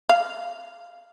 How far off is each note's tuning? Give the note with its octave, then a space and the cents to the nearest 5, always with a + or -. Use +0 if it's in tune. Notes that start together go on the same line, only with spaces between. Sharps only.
F5 -10